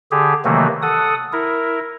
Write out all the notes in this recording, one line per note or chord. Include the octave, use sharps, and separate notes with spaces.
D3 G4 G#4
C3 D#3 E3 F#3 A3 A#3
A4 F#5 D#6
E4 A#4